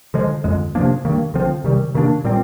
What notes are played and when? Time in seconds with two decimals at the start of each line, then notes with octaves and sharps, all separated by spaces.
0.14 D3 F3 G#3
0.44 F2 D3 G#3
0.75 C3 F3 A#3 D4
1.05 G2 D#3 A#3
1.34 D3 F3 C4
1.64 C3 D#3 G3
1.94 C3 D#3 A#3 D4
2.24 A#2 G3 C4